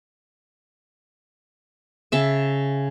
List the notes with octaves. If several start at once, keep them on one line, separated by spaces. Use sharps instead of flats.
C#3 E5 A5